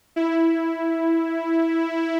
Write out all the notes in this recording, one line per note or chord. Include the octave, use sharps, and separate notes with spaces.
E4